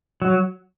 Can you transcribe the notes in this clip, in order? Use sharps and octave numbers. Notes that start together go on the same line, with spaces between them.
F#3